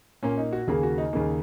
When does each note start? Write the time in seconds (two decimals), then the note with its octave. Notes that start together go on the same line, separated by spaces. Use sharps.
0.23 A#2 A#3 C#4
0.37 D#4
0.53 F#4
0.68 D#2 C#3 A#3 G#4
0.83 F#4
0.98 D#4
1.13 D#2 C#3 A#3